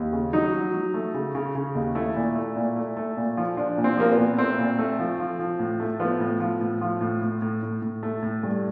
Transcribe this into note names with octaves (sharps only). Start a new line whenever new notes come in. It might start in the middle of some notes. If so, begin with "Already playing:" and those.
Already playing: D#2
C#3
F#3 D#4
F#3
F#3
A3
C#3
C#3
C#3
D#2
A3 E4
A#2
A3
A#2
A3
A3
A#2
F3
F3 D4
A#2
C4
F3 A#3
B3
A#2
A3 C4
A#2
A3
F3
F3
F3
A2
A3
F3 B3
A2
F3
A2
F3
A2
A2
A2
A2
A2
A3
A2
G2